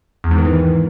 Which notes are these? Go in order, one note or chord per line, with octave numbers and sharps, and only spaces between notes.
E2
G#2
D#3
E3